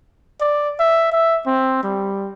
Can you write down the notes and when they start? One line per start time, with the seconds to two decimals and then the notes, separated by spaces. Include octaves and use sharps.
0.40 D5
0.79 E5
1.12 E5
1.46 C4
1.84 G3